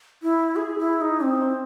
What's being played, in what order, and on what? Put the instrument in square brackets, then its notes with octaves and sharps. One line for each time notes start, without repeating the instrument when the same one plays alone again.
[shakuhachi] E4
G#4
E4
D#4
C4